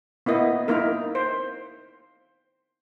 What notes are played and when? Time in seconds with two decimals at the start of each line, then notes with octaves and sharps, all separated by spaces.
0.26 A#3 B3 E4 D#5
0.68 A#3 D#4 E4 A#4
1.15 C5